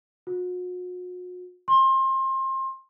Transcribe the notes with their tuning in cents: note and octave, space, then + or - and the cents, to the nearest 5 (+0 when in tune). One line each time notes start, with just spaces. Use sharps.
F#4 -40
C6 +30